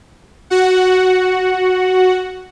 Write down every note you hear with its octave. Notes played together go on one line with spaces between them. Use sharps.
F#4 F#5